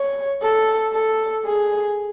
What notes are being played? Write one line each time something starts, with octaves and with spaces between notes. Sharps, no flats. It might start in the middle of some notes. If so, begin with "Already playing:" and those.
Already playing: C#5
A4
A4
G#4